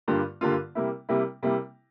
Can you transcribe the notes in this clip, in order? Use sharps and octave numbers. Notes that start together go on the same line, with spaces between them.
G2 D3 G3 A#3 F4
G2 D3 G3 A#3 F4
C3 G3 A#3 E4
C3 G3 A#3 E4
C3 G3 A#3 E4